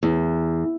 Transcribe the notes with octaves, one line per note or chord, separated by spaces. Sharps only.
E2